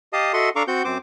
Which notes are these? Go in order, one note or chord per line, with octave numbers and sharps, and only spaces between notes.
G4 D#5 F5 A5 D#6
F#4 A4 D#5 E5 F#5 C6
D4 A4 F5 A#5 C#6 D6
C4 F#4 F#5 G6
F#2 C4 C5 D6